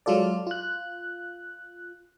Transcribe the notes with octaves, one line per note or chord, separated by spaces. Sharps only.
F#3 G#3 F4 A4 D5
F4 F#6